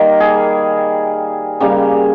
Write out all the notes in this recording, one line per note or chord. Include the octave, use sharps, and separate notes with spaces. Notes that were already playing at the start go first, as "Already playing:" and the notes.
Already playing: D#3 G3 A#3 A#4
G#4
C#3 G3 A#3